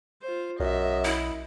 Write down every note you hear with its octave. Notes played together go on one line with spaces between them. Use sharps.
F4 C5
B1 F#2 D#5 E5
E4